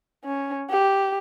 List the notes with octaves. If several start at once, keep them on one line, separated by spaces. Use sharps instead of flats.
C#4
G4